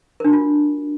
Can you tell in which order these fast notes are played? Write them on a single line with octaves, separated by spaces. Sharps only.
A#4 D4 F#4 F4